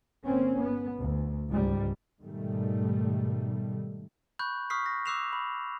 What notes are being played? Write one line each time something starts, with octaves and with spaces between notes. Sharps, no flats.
G1 A#3 C4 C#4
B3
D2
C#2 G#2 G3
G#2 B2 D#3 G3 A3
B5 C#6 F#6 G6
C#6 D#6 F6 B6 C7
A#6
D6 E6 F#6 C7 E7 F7
B5